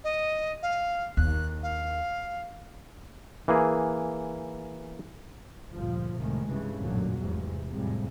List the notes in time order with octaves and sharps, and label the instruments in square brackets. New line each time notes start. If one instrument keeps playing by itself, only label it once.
[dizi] D#5
F5
[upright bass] D#2 [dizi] F#6
[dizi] F5
[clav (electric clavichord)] E3 A#3 G#4
[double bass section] G1 D2 A#2 F3
C2 A2 C3 D#3 G#3
G2 C#3 E3
A1 F#2 A#2 D3 F#3
F1 E2 G#2 C3
F2 A2 C3 G3 G#3